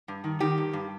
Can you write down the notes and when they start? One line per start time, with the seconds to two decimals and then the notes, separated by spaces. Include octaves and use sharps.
0.08 G2
0.24 D#3
0.40 D#3 G4
0.58 G2
0.73 G2